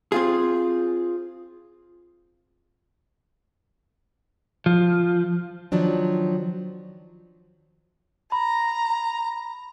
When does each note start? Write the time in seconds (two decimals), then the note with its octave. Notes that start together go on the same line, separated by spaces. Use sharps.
0.12 C4 F4 G#4
4.66 F3
5.72 D#3 F3 F#3 D4
8.32 A#5 B5